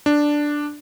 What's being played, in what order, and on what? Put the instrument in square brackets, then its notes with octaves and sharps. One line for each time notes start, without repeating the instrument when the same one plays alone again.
[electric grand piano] D4